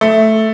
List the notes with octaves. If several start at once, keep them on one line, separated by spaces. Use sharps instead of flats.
A3